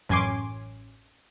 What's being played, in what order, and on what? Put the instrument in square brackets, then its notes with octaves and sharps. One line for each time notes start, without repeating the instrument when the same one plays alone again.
[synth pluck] A1 F#2 C#4 G#5 C6 D6